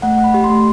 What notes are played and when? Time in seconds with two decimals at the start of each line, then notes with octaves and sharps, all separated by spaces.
0.02 A3 F#5
0.19 A3
0.24 B5
0.34 G4
0.44 C6
0.50 A3